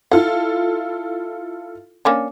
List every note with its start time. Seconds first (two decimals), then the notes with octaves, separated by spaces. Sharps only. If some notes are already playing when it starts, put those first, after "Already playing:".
0.12 E4 F4 A4 F#5
2.05 A#3 C#4 D4